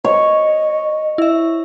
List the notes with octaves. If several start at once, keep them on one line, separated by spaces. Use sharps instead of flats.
C#5 D#5
E4 E5